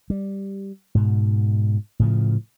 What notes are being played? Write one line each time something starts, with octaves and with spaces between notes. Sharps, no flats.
G3
G#2 B2
A2 C#3 F3